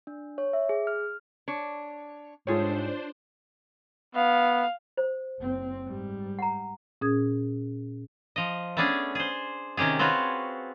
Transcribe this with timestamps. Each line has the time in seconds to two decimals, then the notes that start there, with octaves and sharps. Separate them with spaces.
0.07 D4
0.38 C#5
0.53 E5
0.69 G#4
0.87 F6
1.48 D4 C#5
2.47 G#2 G3 D4 F4 G#4 A4 C5 C#5
4.15 B3 F5
4.97 C5
5.40 F#1 C4
5.83 G#2 G3
6.39 F#5 A#5
7.01 A#2 C#4 G#4 D#6 G#6
8.36 F3 D#5
8.77 A3 B3 C#4 D4 G#4
9.15 G#4 C5
9.77 C3 D#3 C#4 G4 G#4
9.99 C4 F4 F#4 B4 C#5